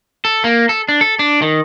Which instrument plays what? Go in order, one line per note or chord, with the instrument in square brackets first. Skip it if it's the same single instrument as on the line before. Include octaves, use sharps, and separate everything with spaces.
[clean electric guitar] A4
A#3
A4
D4
A4
D4
D#3